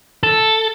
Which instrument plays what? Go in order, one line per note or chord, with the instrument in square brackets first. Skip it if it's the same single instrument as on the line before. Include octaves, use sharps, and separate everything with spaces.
[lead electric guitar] A4